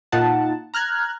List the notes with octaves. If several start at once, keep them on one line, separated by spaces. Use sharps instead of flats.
A#2 D#4 F4 F#5 A5
A#5 F6 F#6 G#6